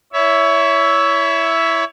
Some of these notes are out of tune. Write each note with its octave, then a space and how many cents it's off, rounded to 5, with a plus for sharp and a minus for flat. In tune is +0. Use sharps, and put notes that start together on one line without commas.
E4 +0 C#5 +25 E5 +0